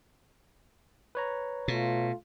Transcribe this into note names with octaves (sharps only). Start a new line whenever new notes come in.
B4 C#5 A#5
B2 A3 F4